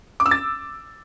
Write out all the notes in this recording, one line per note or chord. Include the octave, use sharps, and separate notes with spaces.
D6
E6
A6